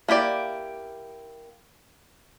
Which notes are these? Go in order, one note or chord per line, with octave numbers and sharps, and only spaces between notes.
A#3 E4 G4 D5